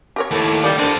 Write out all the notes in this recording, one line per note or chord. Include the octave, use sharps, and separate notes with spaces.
G4 A#4 C#5
D#2 A2
G3 A#4 D5
D3 C4 A4